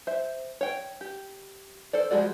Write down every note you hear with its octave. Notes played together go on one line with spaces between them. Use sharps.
C5 E5
C#5 G5
G4
A4 C5 D5
F3 G3 G#3 F#4 D5